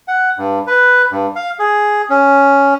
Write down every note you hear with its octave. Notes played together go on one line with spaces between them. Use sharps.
F#5
G2
B4
G2
F5
G#4
C#4